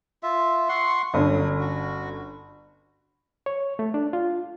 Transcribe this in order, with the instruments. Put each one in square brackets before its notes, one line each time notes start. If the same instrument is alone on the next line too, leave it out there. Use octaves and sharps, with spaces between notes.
[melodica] F4 E5
F#5 C6 C#6
[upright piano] G1 D3 C#4 [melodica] F#3 D#6
[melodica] F#4
[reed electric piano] C#5
A3
D4
F4